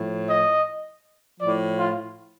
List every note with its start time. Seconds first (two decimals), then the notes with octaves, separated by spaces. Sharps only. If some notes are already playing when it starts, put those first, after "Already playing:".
Already playing: A2 F3
0.29 D#5
1.40 A2 F3 D5
1.78 F4